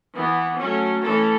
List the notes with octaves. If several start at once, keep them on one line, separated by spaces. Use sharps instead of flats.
E3 B3
F#3 A3 C#4
E3 A3 C#4 A4